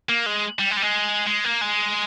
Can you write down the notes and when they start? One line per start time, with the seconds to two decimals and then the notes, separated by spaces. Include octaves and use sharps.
0.09 A#3
0.26 G#3
0.59 G3
0.71 G#3
0.77 G3
0.83 G#3
1.27 G#3
1.44 A#3
1.61 G#3